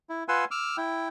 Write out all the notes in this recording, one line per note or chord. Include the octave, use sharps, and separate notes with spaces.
E4
F4 B4 F#5 G#5 C6 E6
D6 E6 F6
E4 G5